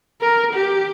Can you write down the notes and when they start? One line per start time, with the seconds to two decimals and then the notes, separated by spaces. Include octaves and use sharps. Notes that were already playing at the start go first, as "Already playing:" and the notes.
0.21 A#4
0.54 G4